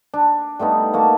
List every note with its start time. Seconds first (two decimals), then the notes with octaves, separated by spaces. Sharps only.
0.14 D4
0.59 G3 A3 B3 D#4
0.94 A#3 F#4 A5